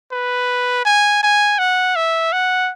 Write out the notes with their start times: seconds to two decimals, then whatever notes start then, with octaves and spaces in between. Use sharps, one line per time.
0.12 B4
0.85 G#5
1.23 G#5
1.59 F#5
1.96 E5
2.33 F#5